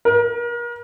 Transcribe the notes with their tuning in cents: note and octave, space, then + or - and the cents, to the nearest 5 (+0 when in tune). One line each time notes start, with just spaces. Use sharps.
A#4 +35